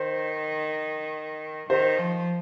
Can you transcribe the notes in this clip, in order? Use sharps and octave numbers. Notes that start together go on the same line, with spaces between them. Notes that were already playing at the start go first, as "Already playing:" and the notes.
Already playing: D#3 C5
D#3 C5
F3